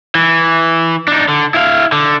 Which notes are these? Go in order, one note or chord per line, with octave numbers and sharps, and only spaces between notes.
E3
D4 D#4
D3
E4 F5
D3